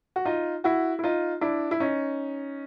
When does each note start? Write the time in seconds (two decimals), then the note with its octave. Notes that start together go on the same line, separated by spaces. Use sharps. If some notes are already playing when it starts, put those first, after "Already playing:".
0.16 F#4
0.25 D#4 F4
0.64 E4 F#4
0.99 E4
1.04 D#4 F4
1.41 D4 E4
1.71 E4
1.80 C#4 D#4